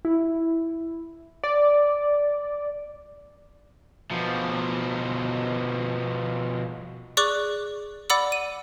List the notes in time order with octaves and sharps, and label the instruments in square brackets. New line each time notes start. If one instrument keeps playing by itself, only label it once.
[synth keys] E4
D5
[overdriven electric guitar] B2 F3
[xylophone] G#4 D5 C#6 D6 F#6
D5 F#5 B5 D6 E6
D#7